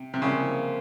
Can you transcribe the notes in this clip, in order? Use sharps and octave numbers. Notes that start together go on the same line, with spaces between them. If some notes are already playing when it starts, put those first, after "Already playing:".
Already playing: C3
C3
A#2 C#3 F3 G#3